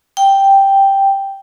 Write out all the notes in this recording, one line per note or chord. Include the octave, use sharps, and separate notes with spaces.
G5